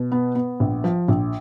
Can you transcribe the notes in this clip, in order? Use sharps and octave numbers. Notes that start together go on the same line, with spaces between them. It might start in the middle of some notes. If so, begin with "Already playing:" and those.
Already playing: B2
B3
B3
A#1
F3
A#1